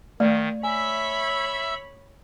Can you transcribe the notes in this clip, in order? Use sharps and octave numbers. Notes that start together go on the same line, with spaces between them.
D#3 A3 D5
C#5 E5 G#5 B5 E6